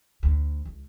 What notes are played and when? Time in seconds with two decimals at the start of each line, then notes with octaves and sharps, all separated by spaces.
0.23 D2
0.65 C#2